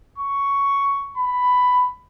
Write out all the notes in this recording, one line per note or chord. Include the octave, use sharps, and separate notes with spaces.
C#6
B5